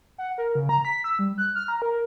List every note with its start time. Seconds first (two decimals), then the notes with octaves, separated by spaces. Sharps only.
0.18 F#5
0.38 A#4
0.55 C#3
0.69 A#5
0.85 B6
1.04 E6
1.19 G3
1.38 F#6
1.55 F6
1.68 A#5
1.82 A#4